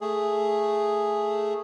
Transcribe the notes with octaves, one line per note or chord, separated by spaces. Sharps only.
A3 G#4